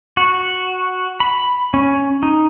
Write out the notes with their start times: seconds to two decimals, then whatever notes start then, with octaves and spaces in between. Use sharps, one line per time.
0.17 F#4
1.20 B5
1.74 C#4
2.23 D#4